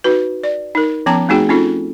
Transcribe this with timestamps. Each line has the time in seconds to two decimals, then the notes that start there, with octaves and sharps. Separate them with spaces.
0.04 D#4 F#4 B4
0.44 D5
0.75 D#4 A#4
1.06 F3 B3 C#4 A5 A#5 D6
1.29 A3 C4 D#4 F#4 G#4 G5
1.49 C4 C#4 D#4 F4 A4